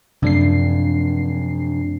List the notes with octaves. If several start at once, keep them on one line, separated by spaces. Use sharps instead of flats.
F#2 C3 F3 A3 D4 C7